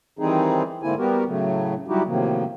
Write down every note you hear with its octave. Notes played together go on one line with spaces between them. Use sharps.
D#3 E3 G3 C4 D#4 G#4
G#2 D3 A#3 C4 E4 G#5
G3 B3 F#4 G4 A#4
A2 C#3 F#3 A3
F#3 G3 D#4 E4 F#4 G4
A2 C3 D#3 F3 F#3 A#3